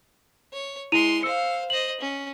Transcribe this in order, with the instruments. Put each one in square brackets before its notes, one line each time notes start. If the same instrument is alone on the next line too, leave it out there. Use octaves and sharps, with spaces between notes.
[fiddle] C#5
[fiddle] G#3 C6 [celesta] E4 D#7 F7
[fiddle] C5 F5 [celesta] E6 C#7
[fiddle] C5 D#5 [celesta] F#7
[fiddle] C#4